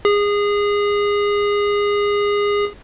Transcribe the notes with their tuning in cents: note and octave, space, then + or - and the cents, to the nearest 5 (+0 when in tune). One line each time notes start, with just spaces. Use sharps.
G#4 -20